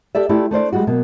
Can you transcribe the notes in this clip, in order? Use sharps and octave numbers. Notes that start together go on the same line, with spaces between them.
G4 A4 D5 E5
A3 E4 F4 G4 D5
A3 D4 C5 D5
G3 G#3 F4 F#4
B2 F#3 A#3